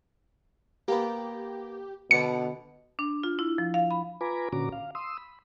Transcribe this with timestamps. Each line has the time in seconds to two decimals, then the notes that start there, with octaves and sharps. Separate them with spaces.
0.88 A#3 B3 G4
2.11 B2 D3 B3 C#7
2.99 D4
3.23 F4
3.39 E4
3.58 F3
3.74 F5
3.91 B5
4.21 F4 B4 G#5 A#5 B5 D6
4.53 A#2 D3 C#4 F#4 A#5 D6
4.73 F5
4.95 C6 D#6 E6
5.18 B5